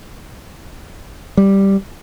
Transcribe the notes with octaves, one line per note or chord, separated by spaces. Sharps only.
G3